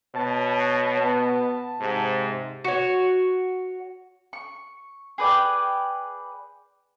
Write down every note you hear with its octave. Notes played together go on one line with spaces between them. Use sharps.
B2 C#5 A5
B3
G#2 C3
F#4 C#5
C#6
G#4 B4 D5 G5